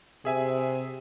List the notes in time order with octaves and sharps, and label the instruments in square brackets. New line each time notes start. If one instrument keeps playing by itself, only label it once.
[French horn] C3 [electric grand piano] G#4 E5 G#5